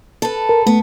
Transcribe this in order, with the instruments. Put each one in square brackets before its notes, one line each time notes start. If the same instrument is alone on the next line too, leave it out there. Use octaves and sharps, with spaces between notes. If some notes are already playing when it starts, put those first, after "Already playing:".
[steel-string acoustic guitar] A4 B4
[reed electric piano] A#4
[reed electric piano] A3 [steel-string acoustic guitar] B3